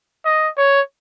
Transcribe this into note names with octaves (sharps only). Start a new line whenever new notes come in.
D#5
C#5